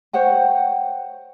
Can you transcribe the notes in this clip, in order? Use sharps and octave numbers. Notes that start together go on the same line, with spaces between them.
C5 C#5 F#5 G5